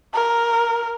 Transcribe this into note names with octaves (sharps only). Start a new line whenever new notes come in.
A#4